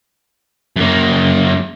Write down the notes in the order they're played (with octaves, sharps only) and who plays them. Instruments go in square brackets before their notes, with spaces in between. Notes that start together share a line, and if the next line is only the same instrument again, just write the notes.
[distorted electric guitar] F#2 A#3